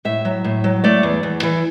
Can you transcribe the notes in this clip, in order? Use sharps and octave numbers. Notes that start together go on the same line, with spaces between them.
A2 E5
F#3
A2
F#3
A3 D5
E2
E2
E3